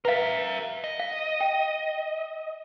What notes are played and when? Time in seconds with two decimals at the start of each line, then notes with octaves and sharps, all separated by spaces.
0.05 A#4 B4 E5 F5
0.84 D#5
1.00 F5
1.41 G5